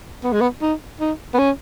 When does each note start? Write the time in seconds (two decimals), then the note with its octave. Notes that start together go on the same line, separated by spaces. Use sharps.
0.24 B3
0.32 G#3
0.41 B3
0.62 D#4
1.00 D#4
1.34 B3
1.39 C#4